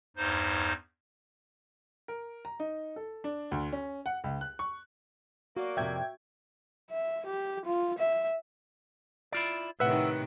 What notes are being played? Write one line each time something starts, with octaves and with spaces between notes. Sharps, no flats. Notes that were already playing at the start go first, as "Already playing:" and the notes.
E2 G2 D#4 C5 G6
A#4
A#5
D#4
A4
D4
D2
C#4
F#5
C#2
F#6
C#6
A#3 F#4 D5
F2 C3 E5 G5 G#6
E5
G4
F4
E5
E4 F4 D5
A2 C3 D#3 B4 E5 F#5